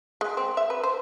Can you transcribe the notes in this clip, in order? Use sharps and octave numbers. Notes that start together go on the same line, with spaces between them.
G#3
C4
E5
B4
C5